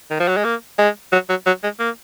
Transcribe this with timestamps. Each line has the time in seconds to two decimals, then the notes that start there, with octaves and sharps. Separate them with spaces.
0.10 D#3
0.19 F3
0.28 F#3
0.37 G#3
0.45 A#3
0.78 G#3
1.12 F#3
1.29 F#3
1.46 F#3
1.63 G#3
1.79 A#3